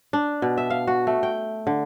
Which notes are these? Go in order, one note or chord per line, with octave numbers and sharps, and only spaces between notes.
D4
B2
E5
F5
F#4
A3
G5
D3